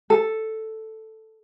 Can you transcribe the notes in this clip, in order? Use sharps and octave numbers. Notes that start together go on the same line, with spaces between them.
A4